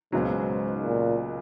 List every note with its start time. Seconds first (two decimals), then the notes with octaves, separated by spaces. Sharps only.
0.12 C#2 G#2 B2 F#3
0.84 A#2